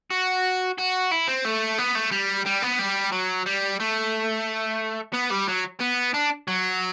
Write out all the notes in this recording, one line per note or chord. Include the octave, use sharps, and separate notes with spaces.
F#4
F#4
E4
C4
A3
B3
A3
G3
G3
B3
G3
F#3
G3
A3
B3
G3
F#3
B3
D4
F#3